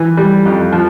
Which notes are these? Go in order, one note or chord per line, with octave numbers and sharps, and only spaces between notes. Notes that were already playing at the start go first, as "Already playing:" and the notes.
Already playing: E3
G3
F2
F3